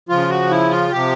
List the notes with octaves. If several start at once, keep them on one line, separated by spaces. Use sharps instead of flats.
C#3 F3 F4
F#4
E4
F4
C3 F3 G4